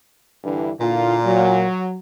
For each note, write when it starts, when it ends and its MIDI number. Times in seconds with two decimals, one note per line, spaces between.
0.44 0.71 43
0.44 0.71 50
0.44 0.71 52
0.81 1.66 46
0.81 1.17 50
0.81 1.17 64
0.81 1.17 65
1.26 1.97 54